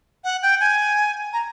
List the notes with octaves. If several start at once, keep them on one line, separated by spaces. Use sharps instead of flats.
F#5
G5
G#5
A#5